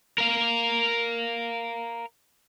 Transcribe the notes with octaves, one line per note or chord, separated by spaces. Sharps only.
A#4 F5